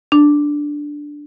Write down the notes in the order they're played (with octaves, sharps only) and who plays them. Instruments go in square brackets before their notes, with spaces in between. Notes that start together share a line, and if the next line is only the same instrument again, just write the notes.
[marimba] D4